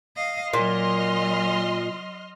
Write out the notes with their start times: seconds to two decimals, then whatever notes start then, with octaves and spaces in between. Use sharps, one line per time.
0.16 D#5 F5
0.53 A#2 F#3 D#5 C6 F6